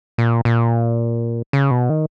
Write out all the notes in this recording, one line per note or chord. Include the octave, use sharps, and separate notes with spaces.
A#2
A#2
C#3
B2
D#3